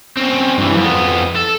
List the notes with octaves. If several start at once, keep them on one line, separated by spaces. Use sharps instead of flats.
C4 C#4
G2 E3
F2 B3
A4